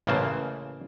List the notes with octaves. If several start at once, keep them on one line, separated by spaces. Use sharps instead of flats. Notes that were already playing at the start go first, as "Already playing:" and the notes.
A1 C#3 E3 A#3 C5 A5